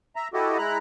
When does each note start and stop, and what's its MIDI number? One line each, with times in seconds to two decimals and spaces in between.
0.16 0.28 76
0.16 0.28 82
0.34 0.58 64
0.34 0.58 66
0.34 0.58 67
0.34 0.58 69
0.34 0.58 75
0.58 0.78 56
0.58 0.78 64
0.58 0.78 82
0.58 0.78 83
0.58 0.78 90